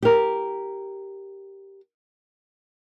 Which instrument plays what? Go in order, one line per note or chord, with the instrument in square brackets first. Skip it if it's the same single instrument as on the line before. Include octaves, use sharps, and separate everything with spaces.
[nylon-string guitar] G4 A#4